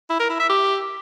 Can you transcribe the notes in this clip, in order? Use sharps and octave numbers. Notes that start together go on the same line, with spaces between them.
E4
A#4
E4
E5
G4